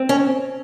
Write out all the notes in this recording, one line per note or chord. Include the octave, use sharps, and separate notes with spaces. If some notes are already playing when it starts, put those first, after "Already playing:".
Already playing: C4
C#4